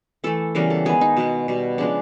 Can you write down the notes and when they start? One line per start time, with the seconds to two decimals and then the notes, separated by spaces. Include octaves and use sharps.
0.24 E3 A3 A4
0.55 C#3 E3 G3 B3 A#4
0.70 A4
0.85 D#3 G#3 B3 G#4
1.01 D#4
1.17 B2 G#3 B3
1.48 B2 G3 B3
1.78 C#3 F3 G#3 B3 D4